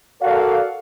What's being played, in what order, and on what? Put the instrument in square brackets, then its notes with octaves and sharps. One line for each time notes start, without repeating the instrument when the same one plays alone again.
[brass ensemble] F#4 A4 A#4 D5 F5